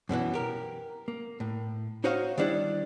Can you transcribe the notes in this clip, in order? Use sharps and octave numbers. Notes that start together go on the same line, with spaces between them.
F#2 B2 D3 E3
G4 A#4
A#3
A2
D#4 F#4 C5 C#5 D#5 F5
D#3 G3 D4 E4